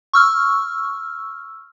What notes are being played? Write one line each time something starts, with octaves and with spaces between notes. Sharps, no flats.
C#6 E6 F6